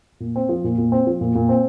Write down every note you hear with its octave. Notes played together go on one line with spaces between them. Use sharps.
A#2
C4
F3
A#2
A#2
C4
F3
A#2
A#2
C4